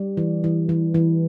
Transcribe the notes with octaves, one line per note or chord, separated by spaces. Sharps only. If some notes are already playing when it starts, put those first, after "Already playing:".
Already playing: G3
E3
E3
E3
E3